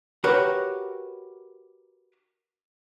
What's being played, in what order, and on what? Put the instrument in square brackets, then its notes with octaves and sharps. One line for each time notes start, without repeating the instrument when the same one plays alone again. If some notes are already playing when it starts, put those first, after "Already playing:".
[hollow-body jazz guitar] F#4 G4 A#4 B4 C#5 F#5